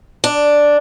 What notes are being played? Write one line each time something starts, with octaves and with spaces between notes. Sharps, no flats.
D4